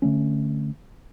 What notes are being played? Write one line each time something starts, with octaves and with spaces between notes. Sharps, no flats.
D3 E3 A3 C#4